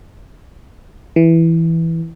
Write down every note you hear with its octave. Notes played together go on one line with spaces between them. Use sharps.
E3